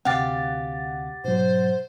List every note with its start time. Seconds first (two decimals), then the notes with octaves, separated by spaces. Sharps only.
0.05 D2 C3 C4 G4 F5 F#5 A6
1.24 G#2 B2 F#3 C5